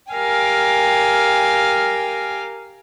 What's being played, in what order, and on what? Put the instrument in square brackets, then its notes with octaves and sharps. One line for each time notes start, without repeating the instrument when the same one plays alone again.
[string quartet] G4 A#4 F5 G5 G#5